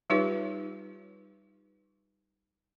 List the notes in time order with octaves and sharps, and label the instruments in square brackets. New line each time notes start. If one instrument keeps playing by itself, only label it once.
[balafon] G3 D#4 F4 G4 B4 C#5